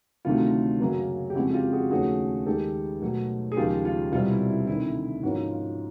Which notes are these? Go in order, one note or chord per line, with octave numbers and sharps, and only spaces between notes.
D2 C3 D#3 F#3 A3 F4
F#2 C#3 F#3 A#3
G4
F2 C#3 F3 G#3 E4 F#4
F4 G4
F#4 G#4
D#2 C#3 F3 A3 C#4 F#4 G#4
D#2 D#3 G#3 G4 A4
B2 F#3 A3
G#4
D#2 C#3 F3 G#3 F4 G4
F4
C2 B2 G3 C4 F4
E4
E4
D2 C3 D#3 E4
G#2 F3 A#3 C#4 E4 F#4
F4
F4